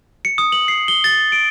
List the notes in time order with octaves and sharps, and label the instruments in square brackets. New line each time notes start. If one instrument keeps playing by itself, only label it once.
[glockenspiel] C#7
D#6
F#7
C7
G7
A6
D7